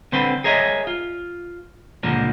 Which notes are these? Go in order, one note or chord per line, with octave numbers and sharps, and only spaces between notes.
D3 C4 B4 C6
G#4 A#4 C#5 D#5 E5
F4
C#2 A#2 D3 F3 A#3